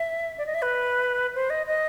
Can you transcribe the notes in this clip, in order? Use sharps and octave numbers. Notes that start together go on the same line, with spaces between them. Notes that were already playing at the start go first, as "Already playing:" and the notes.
Already playing: E5
D5
D#5
E5
B4
C5
D#5
D#5